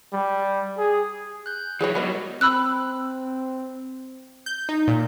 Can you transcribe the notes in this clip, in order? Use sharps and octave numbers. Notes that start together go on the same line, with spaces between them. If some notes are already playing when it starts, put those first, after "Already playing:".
G3
G#4
F#6 G6
E3 F#3 G#4 C5 C#5
F#3 G3 B3 D#4 G4 A#4 B4
C4 B5 E6 F#6
G6
D#4
A#2